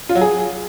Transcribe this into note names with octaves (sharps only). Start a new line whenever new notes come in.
F4
F#3
G#4